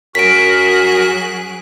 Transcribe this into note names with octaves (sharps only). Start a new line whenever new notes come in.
F#2 F#3 F#4 G#4 A#4 F#6 B6 D7